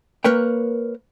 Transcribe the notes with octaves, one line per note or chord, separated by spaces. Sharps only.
A#3 A#4 B4 C#5 G5